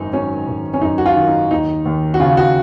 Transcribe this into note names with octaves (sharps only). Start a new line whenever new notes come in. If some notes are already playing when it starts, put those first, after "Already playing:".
Already playing: G#1 F#2 D#3 D#4
F#3 C#4
G#1
C#4
F#2 D#4
F#4
F4
D#3
D#4
D#2 D#4
D#2
F#4
C#3 F4
F#4